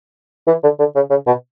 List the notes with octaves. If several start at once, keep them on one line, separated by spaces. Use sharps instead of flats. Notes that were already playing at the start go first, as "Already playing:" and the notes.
E3
D3
D3
C#3
C#3
B2